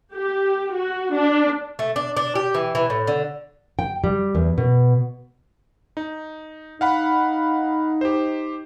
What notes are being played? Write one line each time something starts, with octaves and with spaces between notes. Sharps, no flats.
G4
F#4
D4
A3
D4
D4
G4
E3
E3
A2
D3
G5
G3
E2
B2
D#4
D#4 F5 F#5 B5
G4 C5